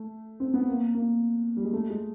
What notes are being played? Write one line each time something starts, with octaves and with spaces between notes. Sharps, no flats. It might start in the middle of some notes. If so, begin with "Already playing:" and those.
Already playing: A3
C4
B3
A#3
A#3
G3
G#3
A3
G#3